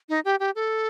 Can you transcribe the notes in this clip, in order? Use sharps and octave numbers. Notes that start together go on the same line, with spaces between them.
D#4
G4
G4
A4